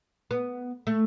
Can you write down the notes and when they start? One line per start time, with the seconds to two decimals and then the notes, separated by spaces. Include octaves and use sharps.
0.31 B3
0.87 A3